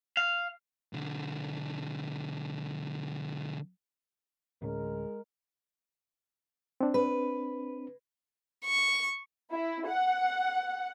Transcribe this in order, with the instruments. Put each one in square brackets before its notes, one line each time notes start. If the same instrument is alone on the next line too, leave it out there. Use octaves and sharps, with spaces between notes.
[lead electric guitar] F5
B1 D3
[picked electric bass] D2 A2 C#4 [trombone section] G#3 A#4
[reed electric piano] C4 D4
[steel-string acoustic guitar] B4
[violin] C#6
[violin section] E4
F#5